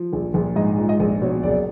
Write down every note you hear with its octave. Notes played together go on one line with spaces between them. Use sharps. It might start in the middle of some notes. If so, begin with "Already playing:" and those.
Already playing: F3
A#1
A#1
G#2 D#5
F3
D#5
A#1
B2 C#5
F#1 D5